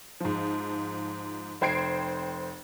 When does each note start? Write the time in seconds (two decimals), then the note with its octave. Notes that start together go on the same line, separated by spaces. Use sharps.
0.20 G#2 F3
1.61 F1 C5 G5 G#6 C7 D7